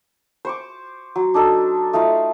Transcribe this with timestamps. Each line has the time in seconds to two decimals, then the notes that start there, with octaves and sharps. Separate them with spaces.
0.45 C5 C#6 D6
1.16 F#3
1.34 D4 D#4 A4
1.93 A3 D#4 F4 F5